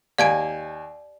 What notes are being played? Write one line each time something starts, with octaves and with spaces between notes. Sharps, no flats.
D#2 D5 F5 G#5 G#6 D7